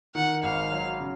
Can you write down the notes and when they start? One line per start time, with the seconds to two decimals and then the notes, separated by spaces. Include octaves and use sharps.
0.15 D#3 F#5
0.43 G#1 F5
0.72 F#3
1.00 C#3